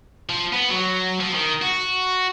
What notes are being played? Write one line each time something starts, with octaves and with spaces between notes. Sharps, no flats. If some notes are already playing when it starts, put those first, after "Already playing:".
F3
B3
F#3
F3
D#3
F#4